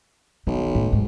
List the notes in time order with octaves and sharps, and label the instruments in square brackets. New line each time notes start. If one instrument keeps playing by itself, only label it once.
[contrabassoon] B1 [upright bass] D#3
[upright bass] A2
G#2